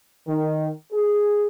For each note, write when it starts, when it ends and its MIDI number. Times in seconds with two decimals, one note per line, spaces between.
0.28 0.69 51
0.93 1.47 68